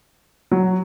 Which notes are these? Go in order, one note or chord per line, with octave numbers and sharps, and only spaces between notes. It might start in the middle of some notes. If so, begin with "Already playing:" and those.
F#3